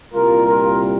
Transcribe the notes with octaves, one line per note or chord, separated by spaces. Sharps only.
C2 A#2 G3 F4 A#4
F4 A#4